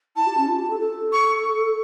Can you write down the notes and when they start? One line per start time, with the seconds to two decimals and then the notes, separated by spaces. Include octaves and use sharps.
0.16 E4 A5
0.26 G4
0.37 C#4
0.48 F4
0.58 G4
0.69 A4
0.79 A4
1.12 C#6